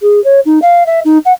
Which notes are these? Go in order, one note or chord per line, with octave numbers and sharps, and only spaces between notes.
G#4
C#5
D#4
F5
E5
D#4
F#5